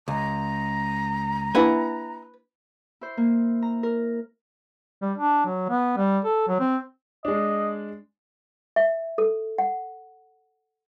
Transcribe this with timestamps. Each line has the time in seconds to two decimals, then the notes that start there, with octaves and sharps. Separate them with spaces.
0.08 C#2 A#5
1.55 A#3 D4 E4 B4 E5 F#5 G#5
3.01 E4 C5
3.17 A#3
3.62 A#5
3.83 A#4
5.02 G3
5.17 D4
5.45 F#3
5.69 B3
5.97 G3
6.25 A4
6.48 F#3
6.60 C4
7.25 G#3 D4 D#5
8.76 E5
9.18 A4
9.58 F#5